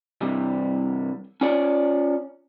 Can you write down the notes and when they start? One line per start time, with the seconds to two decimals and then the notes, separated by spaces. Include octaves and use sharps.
0.21 G2 C3 E3 G3
1.41 C#4 F4 C#5 D5